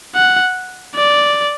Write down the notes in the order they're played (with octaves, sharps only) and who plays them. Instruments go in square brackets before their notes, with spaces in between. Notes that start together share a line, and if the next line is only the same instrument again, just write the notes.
[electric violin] F#5
D5